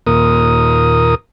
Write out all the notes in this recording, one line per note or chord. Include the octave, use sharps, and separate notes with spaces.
D#2 A#2 A#4 D#6